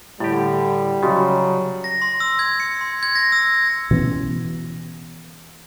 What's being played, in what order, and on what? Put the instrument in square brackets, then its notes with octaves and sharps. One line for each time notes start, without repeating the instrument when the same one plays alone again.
[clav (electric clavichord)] A2 G4 [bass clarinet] D3 [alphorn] G3 [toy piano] E4
[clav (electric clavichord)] C#3 [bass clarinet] F#3 [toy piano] F#4 D#5
[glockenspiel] A#6
C6
E6
G#6
C#7
C6
G#6
A#6
E6
A#6
[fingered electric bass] B2 E3 B3 C#4